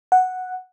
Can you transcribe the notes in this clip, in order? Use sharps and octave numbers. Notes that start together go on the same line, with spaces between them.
F#5